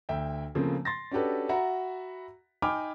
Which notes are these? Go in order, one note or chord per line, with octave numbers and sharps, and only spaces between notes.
D2 E5 G5
C#3 F3 A3 A#3 C4
C6 A6 A#6
C#4 D4 F#4 G4 A4 B4
F#4 E5 F#5 A#5 B5
D#4 G5 G#5 B5 D6 F6